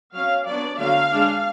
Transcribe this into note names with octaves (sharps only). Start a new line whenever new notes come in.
F#3 C#4 F5
F#3 B3 D4 D5
D3 F#3 A3 F5
G#3 D4